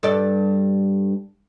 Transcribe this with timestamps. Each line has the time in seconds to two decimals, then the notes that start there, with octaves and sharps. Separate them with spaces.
0.03 G2 A4 D5